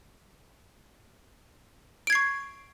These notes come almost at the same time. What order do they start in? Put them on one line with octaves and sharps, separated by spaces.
D7 G#6 C7 C#6